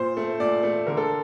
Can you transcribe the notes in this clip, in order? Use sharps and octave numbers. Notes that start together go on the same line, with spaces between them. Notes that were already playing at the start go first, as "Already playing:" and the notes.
Already playing: A#2 C5
A3
A#2 D5
A3
D3 A#4
A4